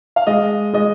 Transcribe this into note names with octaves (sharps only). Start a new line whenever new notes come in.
F5
G#3 D#5
G#3 D#5